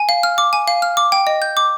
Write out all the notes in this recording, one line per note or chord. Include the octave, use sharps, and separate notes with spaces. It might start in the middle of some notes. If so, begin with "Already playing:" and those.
Already playing: G#5
F5
F6
D6
G#5
F5
F6
D6
G5
D#5
G6
D6